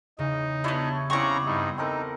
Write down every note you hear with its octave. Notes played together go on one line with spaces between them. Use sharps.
E2 C#3 D#4
B3 D4 E4 G4 C#5
C#3 B3 C4 E4 D5 A#5 C#6
G2 D#4
C4 D#4 A4 A#4